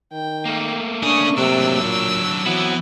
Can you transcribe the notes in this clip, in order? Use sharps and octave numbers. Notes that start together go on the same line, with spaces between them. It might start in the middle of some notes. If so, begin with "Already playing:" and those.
D#3 G5
A3 A#3
C#4 D4 G#4 C#6 D#6
C3 F#3 D4 E6
A#2
E3 F#3 B3 C4 E4 F#5